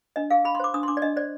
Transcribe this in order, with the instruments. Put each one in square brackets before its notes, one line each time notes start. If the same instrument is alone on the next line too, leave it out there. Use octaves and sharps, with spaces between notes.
[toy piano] D4 D#5
G#4 F5
G#4 B5
C6
C5 D6
D4 D#6
C6
D4 D6
D5
D4 D#5
C5 D5